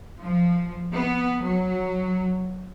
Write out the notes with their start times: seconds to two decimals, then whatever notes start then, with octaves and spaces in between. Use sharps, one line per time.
0.22 F3
0.92 B3
1.43 F#3